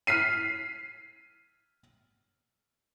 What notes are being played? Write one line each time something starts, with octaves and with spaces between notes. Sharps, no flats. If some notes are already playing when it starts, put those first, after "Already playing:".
F6 B6 C7 D#7